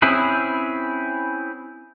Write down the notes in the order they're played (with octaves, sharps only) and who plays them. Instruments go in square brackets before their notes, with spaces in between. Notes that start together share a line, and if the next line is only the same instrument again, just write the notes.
[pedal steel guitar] C4 C#4 E4 G#4 B4